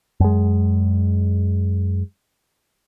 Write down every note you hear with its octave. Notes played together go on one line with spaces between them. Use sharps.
F#2 G#3